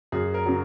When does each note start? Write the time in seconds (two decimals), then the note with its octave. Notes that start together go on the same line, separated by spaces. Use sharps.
0.12 F#2 G#4
0.34 A#4
0.46 C#3 F#3